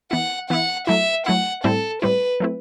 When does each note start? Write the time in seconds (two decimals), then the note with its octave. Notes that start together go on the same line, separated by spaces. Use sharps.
0.11 E3 B3 E4 F#5
0.50 E3 B3 E4 F#5
0.87 F#3 A3 E4 E5
1.26 F#3 A3 E4 F#5
1.64 A2 G3 C4 E4 A4
2.02 A2 G3 C4 E4 B4
2.40 F#3 A3 C4 E4